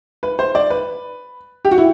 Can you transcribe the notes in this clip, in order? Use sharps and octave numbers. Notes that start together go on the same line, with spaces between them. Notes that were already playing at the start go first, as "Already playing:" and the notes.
B4
C5
D5
B4
G4
F#4
E4